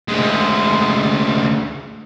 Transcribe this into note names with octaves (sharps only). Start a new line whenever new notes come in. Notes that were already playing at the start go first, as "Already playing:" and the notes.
D2 G#3